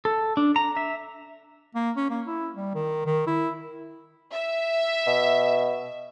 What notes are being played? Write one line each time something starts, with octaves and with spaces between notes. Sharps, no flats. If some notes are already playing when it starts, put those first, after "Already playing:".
A4
D4
A#5
E5
A#3
C#4
A#3
E4
G3
D#3
D#3
E4
E5
B2